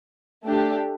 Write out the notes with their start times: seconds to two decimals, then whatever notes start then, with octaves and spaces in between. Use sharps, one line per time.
0.45 A3 D4 G4